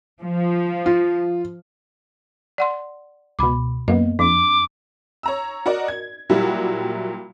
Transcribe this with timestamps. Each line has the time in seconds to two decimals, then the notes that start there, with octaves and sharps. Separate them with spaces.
0.21 F3
0.86 F4
2.58 D5 F#5 C6
3.39 C#2 B2 B5 D6
3.88 F#2 A#3 B3 D#5
4.19 F2 D4 D6
5.23 C#5 A#5 E6
5.66 F#4 A#4 D5 D#5
5.88 G#6
6.29 A#2 F#3 G3 E4 F#4 G4